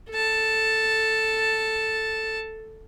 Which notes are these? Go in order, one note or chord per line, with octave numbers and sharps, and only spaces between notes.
A4 A5